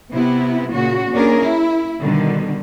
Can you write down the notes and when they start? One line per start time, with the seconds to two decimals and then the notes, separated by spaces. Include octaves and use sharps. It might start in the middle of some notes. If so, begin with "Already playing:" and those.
0.11 C3 B3 E4
0.72 A#2 C#3 F#4
1.11 A#3 C#4 D4 G#4 A#4
1.42 E4
1.98 B2 D3 D#3 G3